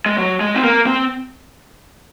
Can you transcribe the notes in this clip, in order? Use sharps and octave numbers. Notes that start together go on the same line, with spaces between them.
G#3
F#3
G#3
C4
A#3
C4